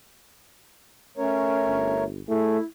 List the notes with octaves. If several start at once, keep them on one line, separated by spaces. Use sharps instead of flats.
A3 C#4 A#4 C#5
G1
A3 E4 G#4